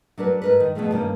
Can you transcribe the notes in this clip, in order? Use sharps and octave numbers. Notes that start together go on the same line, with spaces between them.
F#3 D4 A#4 B4
G#2 A#4 B4
D#3
B2 D3 F3 G#3 A3
G2 D#3 A#3 C#4